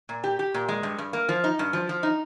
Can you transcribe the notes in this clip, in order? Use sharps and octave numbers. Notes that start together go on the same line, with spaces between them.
A#2
G4
G4
A#2
G#3
G2
G2
A#3
F3
D#4
G2
F3
F3
D#4